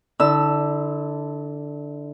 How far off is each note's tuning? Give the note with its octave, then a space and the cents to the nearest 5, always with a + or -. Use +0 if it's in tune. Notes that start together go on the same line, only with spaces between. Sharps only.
D3 +0 E4 -35 E6 +15